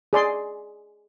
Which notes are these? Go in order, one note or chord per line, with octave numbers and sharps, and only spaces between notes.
G#4 D5 C6